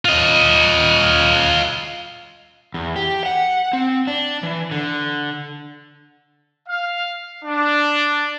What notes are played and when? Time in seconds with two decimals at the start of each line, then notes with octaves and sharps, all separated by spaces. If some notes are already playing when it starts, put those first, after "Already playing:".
0.05 F4 D#5
2.74 E2
2.96 G4
3.26 F#5
3.73 C4
4.07 D4
4.43 E3
4.71 D3
6.67 F5
7.44 D4